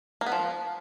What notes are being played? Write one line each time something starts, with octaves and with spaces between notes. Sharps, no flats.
A#3
B3
F3